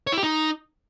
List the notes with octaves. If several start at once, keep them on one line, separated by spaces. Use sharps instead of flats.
C#5
E4
G4
D#4